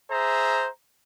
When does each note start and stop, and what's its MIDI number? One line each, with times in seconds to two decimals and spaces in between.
0.11 0.69 68
0.11 0.69 72
0.11 0.69 76
0.11 0.69 82